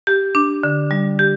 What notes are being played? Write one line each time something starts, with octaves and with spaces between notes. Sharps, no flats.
G4
D4
D3
G3
G4